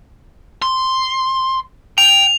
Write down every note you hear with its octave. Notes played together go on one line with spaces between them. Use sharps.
C6
G5 F7